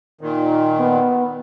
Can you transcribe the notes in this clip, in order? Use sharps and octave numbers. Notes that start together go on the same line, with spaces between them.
A#2 D#3
B3